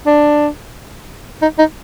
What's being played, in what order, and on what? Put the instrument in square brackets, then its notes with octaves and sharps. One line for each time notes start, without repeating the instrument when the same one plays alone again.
[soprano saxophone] D4
D#4
D#4